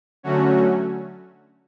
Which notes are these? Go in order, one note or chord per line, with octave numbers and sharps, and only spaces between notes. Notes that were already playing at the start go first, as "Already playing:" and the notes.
D3 F#3 A3 C#4 F#4